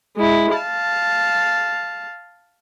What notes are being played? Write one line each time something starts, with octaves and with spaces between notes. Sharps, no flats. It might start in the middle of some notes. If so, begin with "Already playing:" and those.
G#3 E4
F5 A5